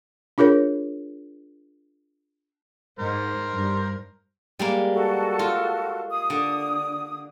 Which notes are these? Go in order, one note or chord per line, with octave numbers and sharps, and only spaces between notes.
D4 F4 G#4 A#4 C#5
G#2 A#4 C5
G2
G3 G#3 A#3
F#4 A4
F4
D#6
D3